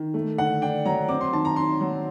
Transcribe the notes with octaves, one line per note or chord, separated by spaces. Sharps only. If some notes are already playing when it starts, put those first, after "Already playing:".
Already playing: D#3
A3
D3 F#5
D4 G5
F#3 A#5
C4 D6
C6
D#3 A5
A#5
D#3 C6
F#3